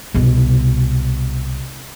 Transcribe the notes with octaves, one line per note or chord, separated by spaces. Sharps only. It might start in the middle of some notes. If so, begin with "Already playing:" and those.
C2 B2